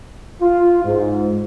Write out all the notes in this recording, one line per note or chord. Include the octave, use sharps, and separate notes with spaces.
F4
G#2